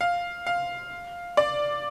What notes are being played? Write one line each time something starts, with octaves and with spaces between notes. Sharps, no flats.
F5
F5
D5